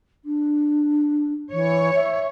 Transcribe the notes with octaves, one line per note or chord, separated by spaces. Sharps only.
D4
E3 C#5
E5